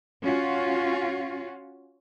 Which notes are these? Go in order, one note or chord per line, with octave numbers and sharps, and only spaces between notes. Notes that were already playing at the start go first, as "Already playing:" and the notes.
C#4 F4 F#4